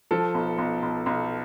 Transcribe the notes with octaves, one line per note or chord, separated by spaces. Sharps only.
F3 A4
B1
B1
B1
B1